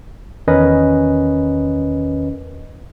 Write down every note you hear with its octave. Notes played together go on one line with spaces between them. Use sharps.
E2 D#3 C#4 A#4 B4 D#5